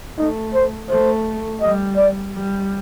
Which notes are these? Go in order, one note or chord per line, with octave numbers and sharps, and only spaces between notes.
A3 D#4
C5
A3 C5
G3 D#5
D5
G3